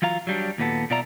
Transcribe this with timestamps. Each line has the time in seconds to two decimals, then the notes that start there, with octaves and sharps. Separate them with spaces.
0.02 E3 F#3 F4 F5 A#5
0.27 F#3 G3 D4
0.58 D#2 A#2 B3 A4
0.90 B2 F4 D5 E5 A#5